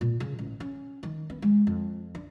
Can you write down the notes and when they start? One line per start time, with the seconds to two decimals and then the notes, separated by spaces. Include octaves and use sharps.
0.01 A#2
0.20 C#3
0.39 A1
0.60 C#4
1.03 D#3
1.30 B3
1.42 G#3
1.67 F2
2.15 D4